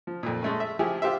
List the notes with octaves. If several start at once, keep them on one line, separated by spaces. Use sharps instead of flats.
F3
F2 A#2
G#3 A3 C#4
E5
F3 E4 G4 G#4
F4 G4 C5 E5